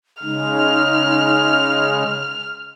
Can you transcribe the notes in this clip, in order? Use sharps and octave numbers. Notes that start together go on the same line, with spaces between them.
C#3 G#3 D#4 F6